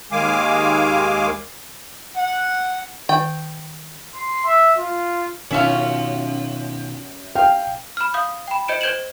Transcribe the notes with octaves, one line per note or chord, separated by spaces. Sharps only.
D#2 D#3 G#3 F5 G#5 D6
F#5
D#3 G5
C6
E5
F4
F#2 B2 D#3 C#4 F4 E5
F5 G5
B5 F6
F5 D#6 G6
G5 B5
C5 D#5 G6 C#7 D7 E7
C5 G6 G#6 D7 E7 F#7